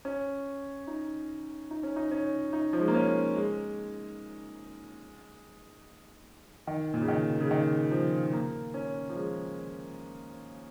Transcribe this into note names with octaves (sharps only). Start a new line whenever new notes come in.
C#4
D#4
D#4
C#4
D#4
C#4
D#4
F3
G#3
A#3
C#4
G#3
D#3
A#2
C#3
D#3
C#3
D#3
F3
A#3
C#4
F3
G#3